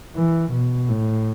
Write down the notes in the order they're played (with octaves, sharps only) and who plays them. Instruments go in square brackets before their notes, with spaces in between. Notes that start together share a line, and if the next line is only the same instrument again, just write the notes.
[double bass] E3
B2
A2